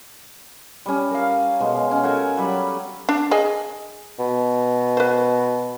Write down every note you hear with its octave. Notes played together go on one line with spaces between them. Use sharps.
G3 C#4
A#4 F5
B2 G#3
C#4
F#4 A4 A#4 G#5
F#3 G3 B5
D4
G#4 D#5 G#5
B2
B4 C5